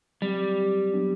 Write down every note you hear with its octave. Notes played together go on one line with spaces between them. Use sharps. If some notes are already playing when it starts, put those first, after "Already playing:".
F#3 G3 C4 G4
F#3 B3 D4 G4